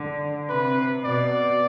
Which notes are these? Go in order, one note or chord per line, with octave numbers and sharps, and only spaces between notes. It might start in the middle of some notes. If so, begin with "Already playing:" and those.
Already playing: D3
C3 B4
B2 D5